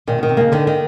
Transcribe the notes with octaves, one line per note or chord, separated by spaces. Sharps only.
A#2 D#3
B2
D#3
C3
C#3 A#3
D3 D#3
D#3